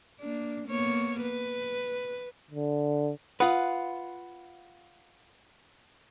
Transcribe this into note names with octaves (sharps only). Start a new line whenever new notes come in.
A#3 D4
A#3 B3 C#5
B4
D3
F4 B4 F#5 D#6